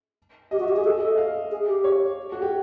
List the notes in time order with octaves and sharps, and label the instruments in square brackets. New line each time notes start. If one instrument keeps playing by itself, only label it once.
[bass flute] G4 [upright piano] D#5
[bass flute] F#4
[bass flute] G4 [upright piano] E5
[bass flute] G#4 [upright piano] D#5
[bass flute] A4 [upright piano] E5
[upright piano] D#5
F5
[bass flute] G#4
G4
[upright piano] C#5
F#4
G4